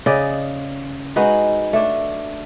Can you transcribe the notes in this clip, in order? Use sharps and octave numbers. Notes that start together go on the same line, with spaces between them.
C#3 D5 D#5
G#3 D#4 F#4 B4
A3 D4